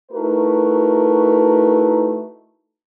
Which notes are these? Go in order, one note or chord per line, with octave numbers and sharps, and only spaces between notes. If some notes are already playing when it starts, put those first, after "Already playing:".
A3 D#4 E4 F#4 A#4 B4